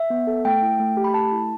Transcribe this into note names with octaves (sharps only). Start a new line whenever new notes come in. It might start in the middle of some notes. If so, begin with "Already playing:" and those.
Already playing: E5
B3
A4
A3 G5
E4
A3
G4
B5
A3 A5
E4